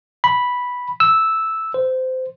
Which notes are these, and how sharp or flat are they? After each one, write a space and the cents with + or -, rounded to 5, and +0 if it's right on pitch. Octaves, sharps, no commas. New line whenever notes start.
B5 -5
E6 -5
C5 -20